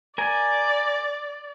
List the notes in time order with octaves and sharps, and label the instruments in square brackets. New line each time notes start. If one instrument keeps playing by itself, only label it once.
[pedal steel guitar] A#4 G#5 [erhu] D5